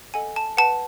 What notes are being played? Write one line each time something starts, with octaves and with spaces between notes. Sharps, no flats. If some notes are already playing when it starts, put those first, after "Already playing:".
A4 D#5 F#5 G#5
A5
B4 F#5 A5